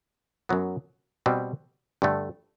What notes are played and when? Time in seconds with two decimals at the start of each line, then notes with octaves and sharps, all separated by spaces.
0.49 F#2 F#3 B3
1.26 B2 G3 C4
2.02 G2 D3 A3